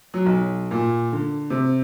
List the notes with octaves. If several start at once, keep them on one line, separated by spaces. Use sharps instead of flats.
F#3
B1
A#2
D3
C3